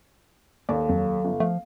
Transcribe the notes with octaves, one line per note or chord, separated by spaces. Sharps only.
D#2 A4 D5 F5
F2 F#3
G1
F3 A3 F5